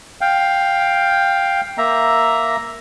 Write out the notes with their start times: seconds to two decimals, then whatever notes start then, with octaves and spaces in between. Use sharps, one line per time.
0.21 F5 G5
1.78 A#3 E5 A#5